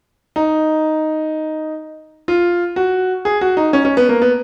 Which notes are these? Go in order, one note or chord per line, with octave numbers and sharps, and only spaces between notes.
D#4
F4
F#4
G#4
F#4
D#4
C#4
C#4
B3
A#3
B3